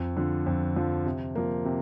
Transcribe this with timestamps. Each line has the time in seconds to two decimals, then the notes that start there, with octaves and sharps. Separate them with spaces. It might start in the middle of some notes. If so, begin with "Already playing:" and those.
Already playing: F2
0.17 D3 F3
0.46 F2
0.76 D3 F3
1.06 C3
1.35 F3 A#3
1.65 C3